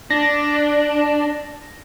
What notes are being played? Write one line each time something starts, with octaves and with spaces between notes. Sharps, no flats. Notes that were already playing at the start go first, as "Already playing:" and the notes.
D4 A#6